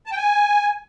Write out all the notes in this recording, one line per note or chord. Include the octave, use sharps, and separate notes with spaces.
A5
G5
G#5